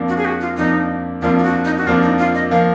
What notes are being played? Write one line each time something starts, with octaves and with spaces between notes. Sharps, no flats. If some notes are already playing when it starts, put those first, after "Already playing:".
Already playing: F2 F3 A#3 D4
F#4
G#4
F#4
F4
F2 F3 A#3 D4 D#4
F2 F3 A#3 D4 F4
F4
F#4
D#4
F#4
F2 F3 A#3 D4 F4
D#4
F4
D#5
F3 A#3 F5